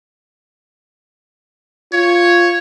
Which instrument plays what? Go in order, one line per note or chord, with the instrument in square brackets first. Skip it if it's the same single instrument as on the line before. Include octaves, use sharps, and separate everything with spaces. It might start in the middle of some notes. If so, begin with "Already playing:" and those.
[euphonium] F4 [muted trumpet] C#5